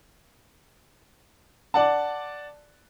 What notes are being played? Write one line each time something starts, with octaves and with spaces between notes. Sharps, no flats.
D5 F#5 A5